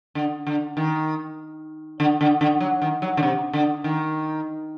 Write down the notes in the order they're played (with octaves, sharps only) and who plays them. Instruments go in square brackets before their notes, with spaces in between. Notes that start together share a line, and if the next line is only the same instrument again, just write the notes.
[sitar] D3
D3
D#3
D3
D3
D3
F#3
D#3
F#3
D3
C3
D3
D#3